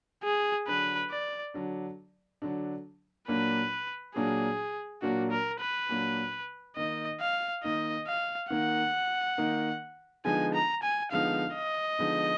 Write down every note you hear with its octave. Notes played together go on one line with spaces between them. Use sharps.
G#4
D3 F#3 D4 B4
D5
D3 F#3 D4
D3 F#3 D4
A#2 F#3 A#3 D4 B4
A#2 F#3 A#3 D4 G#4
A#2 F#3 A#3 D4 F#4
A#4
B4
A#2 F#3 A#3 D4
D#3 A#3 D#4 D#5
F5
D#3 A#3 D#4 D#5
F5
D#3 A#3 D#4 F#5
D#3 A#3 D#4
D3 F3 G#3 B3 D#4 G#5
A#5
G#5
D3 F3 G#3 B3 D#4 F5
D#5
D3 F3 G#3 B3 D#4